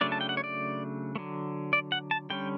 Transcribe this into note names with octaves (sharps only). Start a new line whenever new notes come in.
C#3 F#3 A3 D4 D5
A5
G5
F#5
C#5
D5
D3 F#3 A3
D5
F#5
A5
D3 G3 C#4 G5